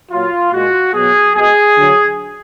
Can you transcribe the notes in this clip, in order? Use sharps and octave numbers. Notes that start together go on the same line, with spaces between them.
A#2 F#3 F4
A#2 G#3 F#4
B2 F#3 G#4
B2 G#3 G#4
D3 F#3